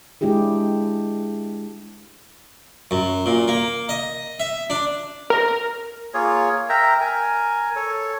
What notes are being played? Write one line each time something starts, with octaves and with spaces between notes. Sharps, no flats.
G#3 D4 E4 G4 G#4
F#2
A#2
A#3
D#5
E5
D4
A#4
A#3 F4 G#4 C#5
A#4 E5 G5 A#5
A#4 G#5
A4 C#5